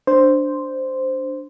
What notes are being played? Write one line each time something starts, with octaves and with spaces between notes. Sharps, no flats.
D4 C5